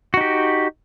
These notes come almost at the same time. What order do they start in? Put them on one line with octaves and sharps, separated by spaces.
F#4 D#4 G4